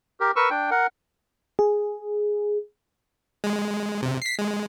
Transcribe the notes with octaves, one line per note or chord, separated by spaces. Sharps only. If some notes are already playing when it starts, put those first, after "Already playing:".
G4 A#4
A#4 B4 C#6 E6
D4 G5
A#4 F#5
G#4
G#3
C3
B6 C7
G#3